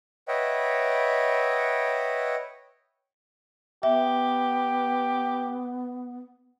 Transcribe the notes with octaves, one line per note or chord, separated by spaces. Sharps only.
B4 C#5 D#5 E5 F#5 G5
B3 G4 E5